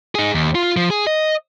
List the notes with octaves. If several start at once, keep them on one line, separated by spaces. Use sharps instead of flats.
D#4 G#4
D#2
F4
F3
G#4
D#5